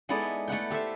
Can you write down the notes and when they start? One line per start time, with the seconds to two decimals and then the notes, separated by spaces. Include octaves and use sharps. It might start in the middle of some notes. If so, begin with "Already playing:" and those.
0.09 G#3 B3 D#4 E4 A4 D5
0.48 A3 E4 F#5 G5
0.70 G4 A4 C5 E5